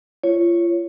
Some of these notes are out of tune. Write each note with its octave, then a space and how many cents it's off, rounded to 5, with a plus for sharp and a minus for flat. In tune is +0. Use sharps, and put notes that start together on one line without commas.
F4 -30 C#5 +0